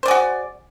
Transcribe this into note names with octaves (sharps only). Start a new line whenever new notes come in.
F#4 G#4 C5 D5